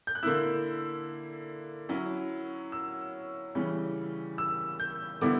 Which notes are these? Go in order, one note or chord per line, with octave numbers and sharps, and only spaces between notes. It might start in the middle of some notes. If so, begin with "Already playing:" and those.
G6
F#6
D3 A#3 E4 E6
F#3 C#4 E4
E6
C#3 E3 G3 C#4
E6
G6
D3 G3 B3 E4 D6